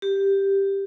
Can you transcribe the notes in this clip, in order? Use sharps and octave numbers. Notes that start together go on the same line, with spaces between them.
G4